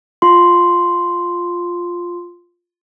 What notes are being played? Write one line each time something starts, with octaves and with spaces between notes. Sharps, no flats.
F4 C6